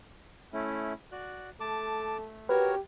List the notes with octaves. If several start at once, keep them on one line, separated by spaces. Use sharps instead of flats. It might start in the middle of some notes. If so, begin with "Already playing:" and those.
A3 C#4 E4
F#4 D5 F#6
A3 A4 A5 D6
F#4 G4 A#4 B4 C#5